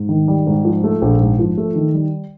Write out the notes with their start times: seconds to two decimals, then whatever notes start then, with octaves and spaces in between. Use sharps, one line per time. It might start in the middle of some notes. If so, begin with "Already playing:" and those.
Already playing: G#2
0.09 D#3
0.28 G3
0.47 G#2
0.65 F3
0.84 A3
1.02 A#1
1.20 G#2
1.39 F3
1.57 A3
1.75 D#3
1.94 G3